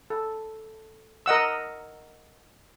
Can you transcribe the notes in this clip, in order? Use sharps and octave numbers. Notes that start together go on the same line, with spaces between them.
A4
A#4 D#5 F#5 E6